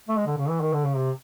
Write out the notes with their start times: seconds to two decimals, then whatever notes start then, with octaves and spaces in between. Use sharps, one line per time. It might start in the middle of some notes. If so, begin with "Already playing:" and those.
0.08 A3
0.17 G#3
0.26 D3
0.37 C#3
0.49 E3
0.61 D#3
0.73 D3
0.85 C#3
0.96 C3